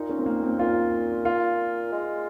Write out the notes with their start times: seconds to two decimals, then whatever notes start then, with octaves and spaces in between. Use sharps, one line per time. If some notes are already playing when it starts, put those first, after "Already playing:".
Already playing: A#2 D#4
0.09 C#4
0.19 C4
0.26 A#3
0.43 C4
0.59 A#2 F4
1.25 F4
1.92 G#3